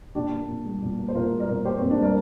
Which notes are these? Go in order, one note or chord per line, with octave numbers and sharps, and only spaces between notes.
A#2 D4 G4
A#3
A#2
G3
A#2
A#3
C5
A#2 F4 A#4
G3
A#4 D5
A#2
A#3 G4 C5
C4
A#2
D4
G3 A#4 D5